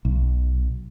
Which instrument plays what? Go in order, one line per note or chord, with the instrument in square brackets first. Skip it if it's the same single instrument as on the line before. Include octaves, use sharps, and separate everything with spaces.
[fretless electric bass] B1